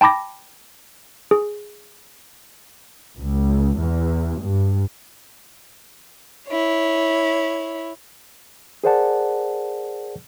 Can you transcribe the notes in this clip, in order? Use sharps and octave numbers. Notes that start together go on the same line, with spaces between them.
G5 A5 B5 D6 A#6
G#4
C#2
E2
G2
E4 C#5
G#4 A#4 C5 D5 F#5 A5